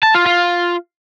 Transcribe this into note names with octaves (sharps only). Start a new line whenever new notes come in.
A5
F4
F4